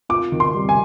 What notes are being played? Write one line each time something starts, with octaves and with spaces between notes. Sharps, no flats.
F4 D6
D#3
C6
G3
G#5